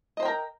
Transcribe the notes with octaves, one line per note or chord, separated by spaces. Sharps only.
A#4 C5 D#5 G5 A#5